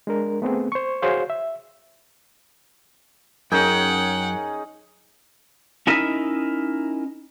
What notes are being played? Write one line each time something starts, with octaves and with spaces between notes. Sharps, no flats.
G#3 D4 A#4
A3 B3 C4 G#4
C5 C#6
F#4 G#4 C5 C#5 F5
E5
F#2 C#4 D#4 G#4 A#4 F#5 G5 G6
C#4 D#4 E4 A#4 D#5 E5